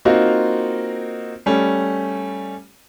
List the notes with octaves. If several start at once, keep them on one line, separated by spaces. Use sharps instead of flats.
A#3 C4 D#4 F4 F#4
G3 A3 C#4